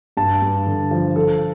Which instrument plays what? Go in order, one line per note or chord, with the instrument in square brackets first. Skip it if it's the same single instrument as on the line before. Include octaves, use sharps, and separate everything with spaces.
[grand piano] G2 A5
G2
D3
F3
F3 A4